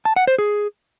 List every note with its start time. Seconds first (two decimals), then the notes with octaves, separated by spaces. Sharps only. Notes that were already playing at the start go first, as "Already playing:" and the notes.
0.05 A5
0.16 F#5
0.27 C5
0.38 G#4